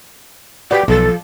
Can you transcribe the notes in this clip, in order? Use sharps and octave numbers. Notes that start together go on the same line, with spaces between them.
F#4 G4 B4 D5
B1 F3 A4